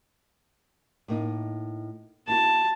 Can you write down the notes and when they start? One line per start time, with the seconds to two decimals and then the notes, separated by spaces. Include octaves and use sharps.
1.08 A2 A#3 D#4
2.28 A#3 E4 F#4 A5